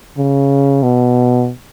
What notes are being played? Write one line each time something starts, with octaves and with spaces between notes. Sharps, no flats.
C#3
B2